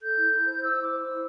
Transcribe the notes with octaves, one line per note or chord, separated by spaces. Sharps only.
A4 G6
E4
E4
C5
C5 E6
E4 D6
C5
E6
E4